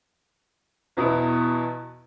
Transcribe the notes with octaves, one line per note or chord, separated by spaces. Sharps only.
E2 B2 B3 E4